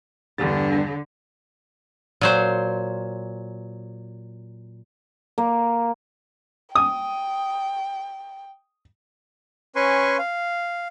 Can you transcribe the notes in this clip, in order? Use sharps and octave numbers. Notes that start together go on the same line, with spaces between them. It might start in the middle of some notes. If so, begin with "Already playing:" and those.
E2 G2 D3 G3 A6
A#2 F#3 C5
A#3
G5 D#6
C#4 B4 G#5 C6 C#6
F5